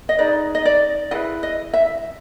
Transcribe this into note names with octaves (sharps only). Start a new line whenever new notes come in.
D#5
D#4 G#4 B4 D5
D#5
D5
E4 G#4 B4 D#5
D#5
E5